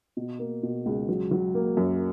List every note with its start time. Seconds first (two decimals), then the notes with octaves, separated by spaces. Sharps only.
0.17 B2
0.39 A#3
0.63 B2
0.86 C#2
1.09 F#3
1.31 F#3
1.54 A#3
1.77 F#2